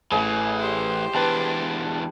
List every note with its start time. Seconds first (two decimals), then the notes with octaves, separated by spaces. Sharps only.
0.12 A1 A2 E3 G#4
0.59 G4 C5
1.15 E2 D4 B4 G5 A5